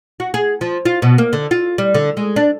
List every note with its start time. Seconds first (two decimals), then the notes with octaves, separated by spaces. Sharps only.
0.20 F#4
0.34 G#4
0.61 F3
0.85 F4
1.02 B2
1.18 A#3
1.33 D3
1.51 F4
1.78 G3
1.94 D3
2.17 G#3
2.36 D4